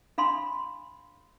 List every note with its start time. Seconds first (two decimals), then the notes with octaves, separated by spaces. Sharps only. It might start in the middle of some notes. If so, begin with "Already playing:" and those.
0.18 D4 F5 B5 C6